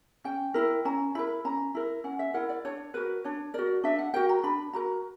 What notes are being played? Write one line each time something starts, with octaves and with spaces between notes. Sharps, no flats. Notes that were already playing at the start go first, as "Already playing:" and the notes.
C#4 G5
E4 A#4
C#4 A#5
E4 A#4 B5
C#4 A#5
E4 A#4
C#4 F#5
E5
E4 A#4 F#5
D5
D4 C#5
F#4 A#4 B4
D4 C#5
F#4 A#4 D5
D4 E5
F#5
F#4 A#4 G5
A#5
D4 B5
F#4 A#4 A#5